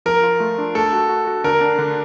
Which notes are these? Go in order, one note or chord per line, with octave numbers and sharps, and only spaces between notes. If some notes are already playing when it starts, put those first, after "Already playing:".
F3 A#4
F4
A3
D4
A3 A4
F#4
F#4
F#4
D3 A#4
D4
D3